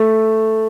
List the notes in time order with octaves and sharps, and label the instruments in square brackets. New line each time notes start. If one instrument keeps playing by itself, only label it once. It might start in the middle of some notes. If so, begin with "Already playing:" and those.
Already playing: [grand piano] A3